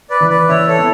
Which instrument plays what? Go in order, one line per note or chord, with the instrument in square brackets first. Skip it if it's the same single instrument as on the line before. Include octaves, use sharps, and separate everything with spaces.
[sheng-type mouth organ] B4 D5
[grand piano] E3
[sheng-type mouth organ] B4 D5
[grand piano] E3 [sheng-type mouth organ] C#5 E5
[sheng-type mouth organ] A4 C#5
[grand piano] B3